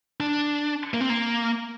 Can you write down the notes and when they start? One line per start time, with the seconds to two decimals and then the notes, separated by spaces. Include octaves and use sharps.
0.20 D4
0.94 A#3
1.01 C4
1.10 A#3